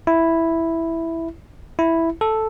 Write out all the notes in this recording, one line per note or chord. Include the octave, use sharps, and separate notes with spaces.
E4
E4
A4